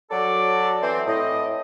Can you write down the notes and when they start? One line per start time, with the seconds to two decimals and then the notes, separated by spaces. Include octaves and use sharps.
0.11 F#3 A4 D5
0.82 E3 C4
1.07 A2 D#5